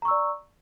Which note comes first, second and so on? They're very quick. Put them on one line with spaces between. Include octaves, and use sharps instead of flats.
A#5 C#6 E6 D5